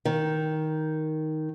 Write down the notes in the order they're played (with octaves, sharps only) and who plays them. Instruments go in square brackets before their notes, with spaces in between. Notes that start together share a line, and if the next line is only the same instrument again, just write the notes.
[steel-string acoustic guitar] D#3